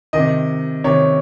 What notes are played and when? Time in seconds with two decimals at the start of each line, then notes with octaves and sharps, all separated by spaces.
0.13 C3 D#3 D#5
0.84 C3 D#3 C#5